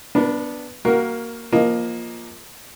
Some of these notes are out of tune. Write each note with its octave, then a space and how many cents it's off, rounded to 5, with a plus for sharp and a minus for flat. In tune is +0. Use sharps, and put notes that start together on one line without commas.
B3 +0 D4 +0 A#4 +45
A#3 +0 F#4 +15 A#4 +15
F3 +0 A#3 +15 D#5 +0